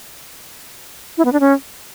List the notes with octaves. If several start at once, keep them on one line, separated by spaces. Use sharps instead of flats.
E4
B3
D4
C#4